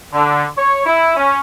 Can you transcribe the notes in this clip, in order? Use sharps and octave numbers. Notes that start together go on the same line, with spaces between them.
D3
C#5
E4
C#4